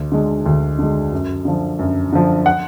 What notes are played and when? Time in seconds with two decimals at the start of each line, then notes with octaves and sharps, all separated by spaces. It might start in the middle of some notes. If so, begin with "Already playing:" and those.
Already playing: D2
0.12 D3 G#3
0.46 D2
0.79 D3 G#3
1.12 F#2
1.45 D3 F3
1.79 F#2
2.13 D3 F3
2.46 F#5